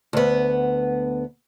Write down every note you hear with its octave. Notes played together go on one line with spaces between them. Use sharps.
D2 B3